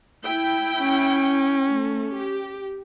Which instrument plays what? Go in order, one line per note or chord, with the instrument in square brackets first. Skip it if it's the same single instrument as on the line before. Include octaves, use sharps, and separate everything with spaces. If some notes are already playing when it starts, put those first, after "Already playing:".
[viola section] E4 G5
[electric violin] C#4
[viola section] A3
G4